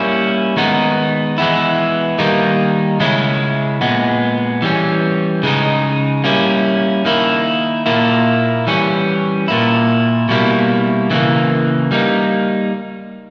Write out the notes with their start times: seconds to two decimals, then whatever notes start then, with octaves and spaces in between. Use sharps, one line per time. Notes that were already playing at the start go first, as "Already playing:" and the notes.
Already playing: G3 A#3 C#4 E4
0.57 D#3 G#3 B3 D#4
1.38 E3 G#3 B3 E4
2.19 D#3 G3 A#3 D#4
3.00 C#3 G#3 C#4 E4
3.81 A#2 G#3 B3
4.62 E3 G3 C#4
5.43 C#3 G#3 D#4
6.24 G3 A#3 C#4 E4
7.05 D#3 A#3 E4
7.86 A#2 A#3 E4
8.67 E3 G3 C#4
9.48 A#2 A#3 E4
10.29 B2 G3 A#3 E4
11.10 C#3 E3 G3 A#3
11.91 G3 A#3 D#4